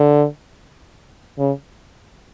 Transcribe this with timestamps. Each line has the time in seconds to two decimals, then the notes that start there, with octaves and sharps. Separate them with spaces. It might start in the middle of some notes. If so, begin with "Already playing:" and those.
Already playing: D3
1.38 C#3